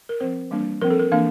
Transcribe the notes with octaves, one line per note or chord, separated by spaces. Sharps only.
A#4
F3 C4 C5
E3 G3 A#3 D4
F3 C4 A#4
A4
A#4
E3 A#3 D4 F5